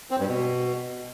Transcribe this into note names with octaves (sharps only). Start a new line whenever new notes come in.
C4
G2
B2